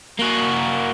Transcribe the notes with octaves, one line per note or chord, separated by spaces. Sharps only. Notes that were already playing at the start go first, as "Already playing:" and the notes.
A#3 F#4